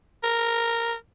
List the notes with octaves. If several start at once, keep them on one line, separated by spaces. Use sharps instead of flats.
A#4